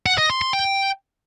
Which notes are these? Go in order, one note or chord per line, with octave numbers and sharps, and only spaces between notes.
F#5
D#5
C6
C6
G5